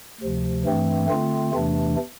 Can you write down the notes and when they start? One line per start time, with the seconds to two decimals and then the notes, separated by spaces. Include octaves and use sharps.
0.21 D2 C3 F3
0.65 G2 E3 A3 C4
1.09 D3 A3 C4 F4
1.52 E2 C3 E3 A3 D4